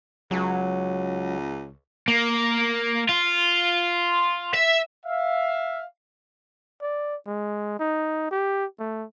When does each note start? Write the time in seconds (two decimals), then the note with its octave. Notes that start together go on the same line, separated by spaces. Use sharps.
0.31 C#2 F#3
2.08 A#3
3.09 F4
4.54 E5
5.06 E5 F5
6.82 D5
7.26 G#3
7.79 D#4
8.30 G4
8.79 A3